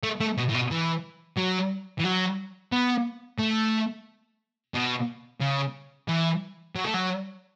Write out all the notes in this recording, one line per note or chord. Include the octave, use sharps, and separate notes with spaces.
A3
A3
B2
A2
B2
E3
F#3
E3
F#3
B3
A3
B2
C#3
E3
F#3
A3
F#3